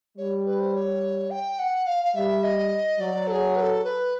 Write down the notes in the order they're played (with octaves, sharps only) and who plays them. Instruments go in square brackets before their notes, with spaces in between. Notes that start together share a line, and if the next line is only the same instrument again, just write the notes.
[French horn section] G3 [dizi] C#5
[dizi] B4
C5
C#5
G5
F#5
F5
F5
[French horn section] G3 [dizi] E5
[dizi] D#5
[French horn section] F#3 [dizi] D5
[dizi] A4
G#4
B4
A4
B4